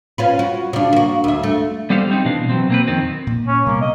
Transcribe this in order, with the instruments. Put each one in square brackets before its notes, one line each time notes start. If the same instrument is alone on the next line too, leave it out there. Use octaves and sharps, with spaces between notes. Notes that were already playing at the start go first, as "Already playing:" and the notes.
[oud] C#4 F4 B4
F#4
C#3 D4
A#3 F#4
D2 E5
A3
[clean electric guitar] G3 B3 G4 A4 C5 F5
G3 C4 D#4
B2 E3 D4 F5
B2 F#3 C4
A#3 C4 B4
F2 D#3 C4
[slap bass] A#2
[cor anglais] C#4
[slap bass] C3 G3 B3 [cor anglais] A#3
[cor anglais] D#5